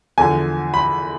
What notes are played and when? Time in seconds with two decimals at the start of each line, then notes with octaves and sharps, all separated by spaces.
0.18 E2 D3 F3 G#5
0.74 B5